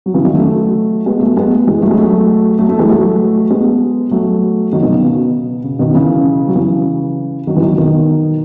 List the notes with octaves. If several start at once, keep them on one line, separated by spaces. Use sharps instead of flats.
F#3
C#3 E3
D#3 F#3
F#3 A3
G#3 B3
F#3 A3
G#3 B3
E3 G#3
F#3 A3
G#3
F#3 A3
F#3 A3
F#3 A3
E3 G#3
F#3 A3
G#3 B3
F#3 A3
D#3 F#3
B2 D#3
C#3
B2
C#3
B2 D#3
C#3 E3
F#3
C#3 E3
D#3 F#3
E3
D#3 F#3
B2 D#3